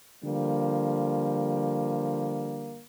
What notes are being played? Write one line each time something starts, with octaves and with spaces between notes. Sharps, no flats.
D3 F3 G3 A#3